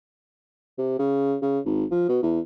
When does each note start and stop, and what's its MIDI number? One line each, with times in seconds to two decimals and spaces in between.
0.78 0.94 48
0.99 1.36 49
1.42 1.60 49
1.65 1.85 32
1.91 2.04 53
2.09 2.18 47
2.23 2.40 40